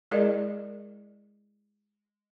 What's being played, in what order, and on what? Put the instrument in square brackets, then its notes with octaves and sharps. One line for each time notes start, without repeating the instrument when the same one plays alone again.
[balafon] G#3 E4 G#4 A#4 D5 D#5